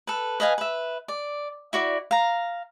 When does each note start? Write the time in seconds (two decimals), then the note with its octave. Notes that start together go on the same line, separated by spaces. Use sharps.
0.07 A4 B4
0.40 B4 D#5 F5 G#5
0.58 B4 E5
1.08 D5
1.73 E4 F#4 D5
2.11 F5 A#5